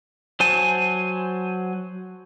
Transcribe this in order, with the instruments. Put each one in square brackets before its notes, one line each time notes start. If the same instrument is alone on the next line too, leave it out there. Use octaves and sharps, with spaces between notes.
[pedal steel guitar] F#3 C5 G#5 A5